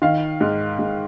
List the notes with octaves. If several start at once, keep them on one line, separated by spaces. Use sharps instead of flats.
D#3 F5
G#2
G#2